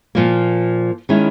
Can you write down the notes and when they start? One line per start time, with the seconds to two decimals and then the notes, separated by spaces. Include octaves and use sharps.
0.15 A#2 F3 A#3
1.09 D#3 G#3 C#4 E4